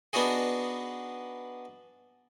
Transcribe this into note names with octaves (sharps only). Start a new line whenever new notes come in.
B3 D4 D#4 F#4 G#4